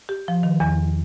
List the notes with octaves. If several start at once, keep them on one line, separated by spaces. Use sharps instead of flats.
G4
F3
D#3
E2